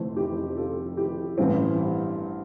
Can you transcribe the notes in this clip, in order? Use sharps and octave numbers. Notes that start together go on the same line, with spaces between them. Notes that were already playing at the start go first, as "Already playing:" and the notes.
Already playing: F1 F2 E3 A3 C4
E4 G4
F4 A4
E4 G4
A1 G2 E3 C4 E4